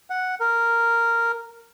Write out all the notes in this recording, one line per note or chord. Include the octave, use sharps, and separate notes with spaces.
F#5
A#4